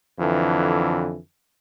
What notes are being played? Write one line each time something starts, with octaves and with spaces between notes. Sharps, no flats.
F2 D3 E3